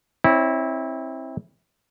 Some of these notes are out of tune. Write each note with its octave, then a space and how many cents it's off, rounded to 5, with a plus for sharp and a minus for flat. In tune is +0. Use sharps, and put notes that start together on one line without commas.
C4 +25 E4 -20 C#5 +30